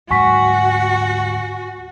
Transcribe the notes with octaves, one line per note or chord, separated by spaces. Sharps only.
D2 G#2 F#3 F#4 F#5 G#5 C#6 B6